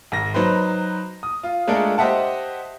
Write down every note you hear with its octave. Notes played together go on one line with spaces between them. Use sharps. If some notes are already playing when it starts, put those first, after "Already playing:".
G#1 A#6
F#3 D#4 B4 C5
D#6
F4
G#3 A3 D4 F4 A4 A#4
G4 C5 D#5 E5 F#5 A5